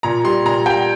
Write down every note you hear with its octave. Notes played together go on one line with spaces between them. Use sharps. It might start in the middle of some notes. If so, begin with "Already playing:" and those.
A#2 A#5
G3 C6
A#2 A#5
G3 G5